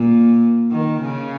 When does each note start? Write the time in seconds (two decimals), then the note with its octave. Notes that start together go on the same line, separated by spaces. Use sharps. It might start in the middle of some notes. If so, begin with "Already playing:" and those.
Already playing: A#2
0.71 D#3
1.01 C#3